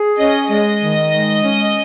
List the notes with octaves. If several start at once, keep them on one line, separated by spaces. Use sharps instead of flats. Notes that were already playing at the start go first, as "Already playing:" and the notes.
Already playing: G#4
C#4 D#5
G#3 D#5
D#3
G#3
C#4